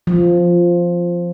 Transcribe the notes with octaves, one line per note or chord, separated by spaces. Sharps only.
F3